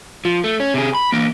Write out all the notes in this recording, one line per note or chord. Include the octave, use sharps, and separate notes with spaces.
F3
A3
C#4
C3 G#4
B5
E3 A#3